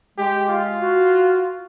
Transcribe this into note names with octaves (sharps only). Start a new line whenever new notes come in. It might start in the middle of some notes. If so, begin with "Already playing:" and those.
G#3 G4
F4
F#4